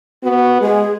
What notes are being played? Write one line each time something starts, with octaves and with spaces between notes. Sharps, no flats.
B3 F#4
G#3 G#4